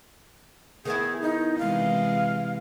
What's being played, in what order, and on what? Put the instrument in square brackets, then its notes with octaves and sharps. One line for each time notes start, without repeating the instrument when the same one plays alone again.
[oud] D#3 B3 E4 [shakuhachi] G#4
[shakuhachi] D#4
[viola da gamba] C3 E3 G#3 [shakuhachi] F5